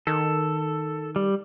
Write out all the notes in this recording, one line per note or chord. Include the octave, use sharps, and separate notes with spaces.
D#3 A4
G3